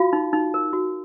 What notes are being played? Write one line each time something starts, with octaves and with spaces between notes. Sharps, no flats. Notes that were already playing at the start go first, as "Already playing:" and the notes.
Already playing: F4 F#4 F5
D#4
D#4
A#4
F#4